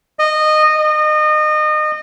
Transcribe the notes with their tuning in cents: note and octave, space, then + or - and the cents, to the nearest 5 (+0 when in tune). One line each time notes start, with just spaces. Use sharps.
D#5 -15
D#5 -30